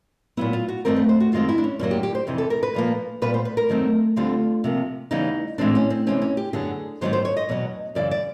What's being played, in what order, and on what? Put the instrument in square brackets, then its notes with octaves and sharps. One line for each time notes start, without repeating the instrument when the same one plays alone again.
[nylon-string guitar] A#2 F#3 B3 E4
F4
F#4
G2 D#3 F#3 A3 C4 A#4
B4
C5
F#4
F#2 D#3 G#3 C4 F4
E4
D4
C#4
F#2 D3 F#3 A#3 C#4
G4
G4
C5
F2 C3 E3
A4
A#4
B4
A#2 F3 A#3
A#2 G3 B3 B4
C5
B4
A#4
F#2 D#3 F#3 A3 C4
D2 D3 G3 C4 F4
C3 F3 A#3
E2 C#3 E3 G3 B3 D#4
A2 E3 G#3 C4 D4
C#4
C4
C3 E3 G#3 C4 C#4
C#4
G4
F#2 D3 F#3 B3 G#4
G#2 D#3 F#3 B3 C5
C5
C#5
D#5
E2 B2 F#3
F#2 C#3 E3 D5
D5